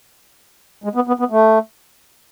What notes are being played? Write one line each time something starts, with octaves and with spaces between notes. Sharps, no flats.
G#3
B3
B3
B3
A3